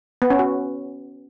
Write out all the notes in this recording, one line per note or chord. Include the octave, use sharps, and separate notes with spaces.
B3
C#4
F#4